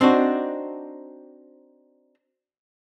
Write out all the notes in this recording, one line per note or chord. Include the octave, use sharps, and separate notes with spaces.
C4 D4 D#4 F#4